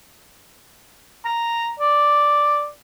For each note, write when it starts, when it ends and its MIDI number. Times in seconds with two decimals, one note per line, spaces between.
1.25 1.72 82
1.79 2.69 74